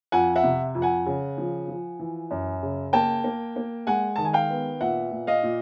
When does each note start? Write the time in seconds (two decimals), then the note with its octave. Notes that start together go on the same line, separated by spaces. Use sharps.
0.12 F2 F#5 G#5
0.36 E5 F#5
0.43 C3
0.75 F2
0.82 F#5 G#5
1.06 C#3
1.38 F3
1.68 F3
1.99 E3
2.31 F#2
2.63 C#3
2.93 A#3 G5 A5
3.24 A#3
3.56 A#3
3.87 G#3 F#5 G#5
4.16 D#3 A5
4.25 G#5
4.33 F5 G5
4.50 B3
4.81 A#2 E5 F#5
5.11 A#2
5.27 D#5 F5
5.43 A#2